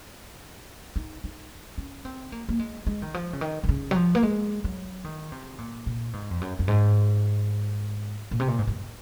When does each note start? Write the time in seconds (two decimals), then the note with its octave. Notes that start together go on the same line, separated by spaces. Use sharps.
0.96 D#4
1.24 D#4
1.78 C#4
2.05 C4
2.32 A#3
2.49 A#3
2.59 G#3
2.87 G#3
3.02 D#3
3.14 F3
3.33 C#3
3.41 D#3
3.64 D#3
3.69 C#3
3.91 F#3
3.96 F3
4.15 A#3
4.23 G#3
4.64 F#3
5.04 D#3
5.32 C3
5.58 A#2
5.86 A#2
6.13 G#2
6.31 F2
6.41 F#2
6.59 F#2
6.68 G#2
8.31 A#2
8.40 C3
8.48 A#2
8.59 G#2
8.67 F#2